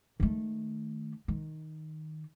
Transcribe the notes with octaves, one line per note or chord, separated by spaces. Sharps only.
D#3 A3
D#3